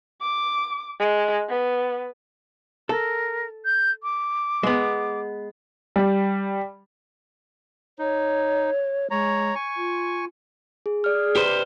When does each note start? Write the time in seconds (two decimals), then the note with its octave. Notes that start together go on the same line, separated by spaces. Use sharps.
0.21 D6
1.00 G#3
1.49 B3
2.89 A4 A#4
3.65 G6
4.03 D6
4.63 G#3 B3
5.96 G3
7.99 D#4 C#5
9.11 G#3 C#5 A#5
9.55 G#5 C#6
9.77 F4
10.86 G#4
11.04 G#4 D5 F6
11.35 G4 B4 C5